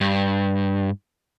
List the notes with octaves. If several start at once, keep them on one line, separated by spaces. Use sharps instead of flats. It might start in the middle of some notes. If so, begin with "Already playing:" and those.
G2